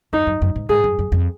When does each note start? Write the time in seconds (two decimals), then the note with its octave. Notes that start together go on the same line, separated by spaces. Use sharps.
0.13 F#2 D#4
0.27 F#2
0.42 F#2
0.56 G#2
0.69 G#2 G#4
0.84 F#2
0.99 F#2
1.12 F2